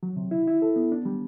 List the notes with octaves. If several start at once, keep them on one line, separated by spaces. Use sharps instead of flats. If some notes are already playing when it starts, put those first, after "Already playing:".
F#3
C3
E4
E4
A4
B3
D4
G3